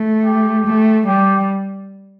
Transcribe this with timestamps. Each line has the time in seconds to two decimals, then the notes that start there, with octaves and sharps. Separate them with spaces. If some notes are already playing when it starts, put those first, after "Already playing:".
Already playing: A3
0.25 G4
0.66 A3
1.07 G3 G4